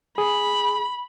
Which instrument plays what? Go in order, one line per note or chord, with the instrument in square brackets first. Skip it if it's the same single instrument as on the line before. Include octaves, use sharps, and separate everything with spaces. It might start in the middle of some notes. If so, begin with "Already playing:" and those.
[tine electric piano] G#4 [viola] B5